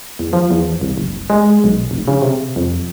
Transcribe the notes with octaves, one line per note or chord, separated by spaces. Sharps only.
E2
F3
E2
C2
F#1
G#3
B1
F1
C#3
C3
F2